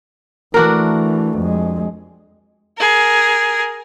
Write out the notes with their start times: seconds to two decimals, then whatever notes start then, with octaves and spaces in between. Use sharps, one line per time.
0.54 E3 A3 D4 F#4 A#4
1.38 F2 G#3
2.77 G#4 A#4